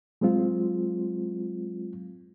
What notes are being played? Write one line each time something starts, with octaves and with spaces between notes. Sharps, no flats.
F#3 G#3 C4 F4